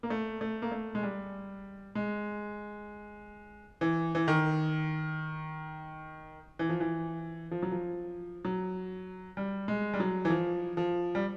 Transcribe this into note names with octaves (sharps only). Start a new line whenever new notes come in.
A#3
A3
A3
A#3
A3
G#3
G3
G#3
E3
E3
D#3
E3
F3
E3
F3
F#3
F3
F#3
G3
G#3
G3
F#3
E3
F3
F3
G3